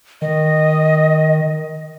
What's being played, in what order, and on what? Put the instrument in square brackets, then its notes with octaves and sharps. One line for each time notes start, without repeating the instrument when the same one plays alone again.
[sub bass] D#3 [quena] D#5